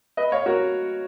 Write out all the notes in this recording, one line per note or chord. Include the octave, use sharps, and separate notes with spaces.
B4 D#5
C#5 F5
F#4 A#4